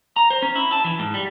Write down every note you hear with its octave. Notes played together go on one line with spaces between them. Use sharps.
A#5
C5
C#4
E4
A5
E3
G#2
G3